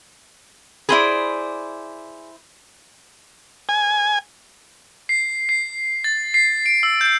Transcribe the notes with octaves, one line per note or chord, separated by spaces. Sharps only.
E4 G#4 C5 D5 B5
G#5
C7
C7
A6
C7
D7
E6
G6